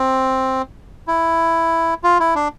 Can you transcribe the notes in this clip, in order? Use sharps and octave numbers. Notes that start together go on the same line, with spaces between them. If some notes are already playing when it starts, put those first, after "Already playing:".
Already playing: C4
E4
F4
E4
D4